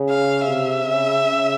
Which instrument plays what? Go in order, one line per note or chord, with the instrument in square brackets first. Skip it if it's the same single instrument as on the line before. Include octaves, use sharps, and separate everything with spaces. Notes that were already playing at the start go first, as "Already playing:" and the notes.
Already playing: [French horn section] C#3
[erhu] F5
[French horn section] C3 [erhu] E5
[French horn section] C#3
C#3